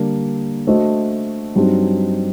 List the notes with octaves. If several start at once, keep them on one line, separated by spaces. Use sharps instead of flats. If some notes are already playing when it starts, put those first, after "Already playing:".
Already playing: D3 G3 A#3 D4
A3 D4 F#4 C5 D#5
G2 F#3 C4 D#4 G4